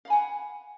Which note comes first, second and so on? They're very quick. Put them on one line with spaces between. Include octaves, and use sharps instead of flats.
F5 B5 G#5 F#5